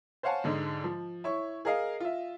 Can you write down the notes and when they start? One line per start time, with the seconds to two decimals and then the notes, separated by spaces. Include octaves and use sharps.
0.23 C5 C#5 F5 F#5 G#5 A5
0.44 G#2 D3 G#3
0.84 F3
1.24 E4 C#5 C#6
1.65 G#4 A#4 D#5 F5
2.00 F4 E5